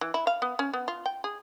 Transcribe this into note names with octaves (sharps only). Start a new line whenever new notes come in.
E3
E4
F5
B3
C#4
B3
F4
G5
G#4